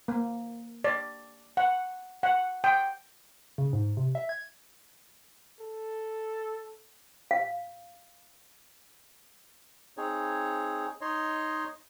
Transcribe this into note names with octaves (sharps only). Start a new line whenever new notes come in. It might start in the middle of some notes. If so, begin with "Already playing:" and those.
A#3
D5
F#5
F#5
G5
C#3
G#2
C3
E5
G#6
A4
F5
C4 D#4 G#4 C#5
D#4 C#5 D#5 C6